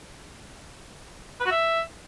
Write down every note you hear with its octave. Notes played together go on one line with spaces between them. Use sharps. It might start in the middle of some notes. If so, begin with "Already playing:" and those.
B4
F#4
E5